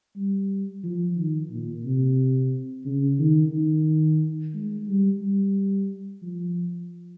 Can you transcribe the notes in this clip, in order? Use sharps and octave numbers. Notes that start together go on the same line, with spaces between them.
G3
F3
D#3
A#2
C3
C#3
D#3
D#3
G#3
G3
G3
F3